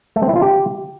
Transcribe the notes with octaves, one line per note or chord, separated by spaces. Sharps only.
A3
C4
E4
F4
G4